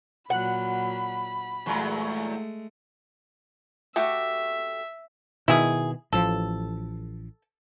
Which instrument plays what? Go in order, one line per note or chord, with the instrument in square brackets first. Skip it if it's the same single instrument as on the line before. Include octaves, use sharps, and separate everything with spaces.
[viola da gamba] A#2 F#3 [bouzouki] F#5 [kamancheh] B5
[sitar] E2 A#2 F#3 [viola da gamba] G#3 A3
[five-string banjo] A3 F#4 G4 [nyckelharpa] E5
[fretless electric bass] B2 D#3 [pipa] E4 G#4
[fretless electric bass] A1 F3 [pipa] A4